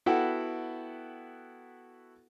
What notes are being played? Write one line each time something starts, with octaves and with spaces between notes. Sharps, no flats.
B3 E4 F#4 A4 F#5 G5